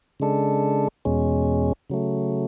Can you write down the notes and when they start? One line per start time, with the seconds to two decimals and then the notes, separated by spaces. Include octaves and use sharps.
0.20 C#3 G#3 D4 A4
1.05 E2 B2 G#3 C#4
1.90 C#3 F#3 A3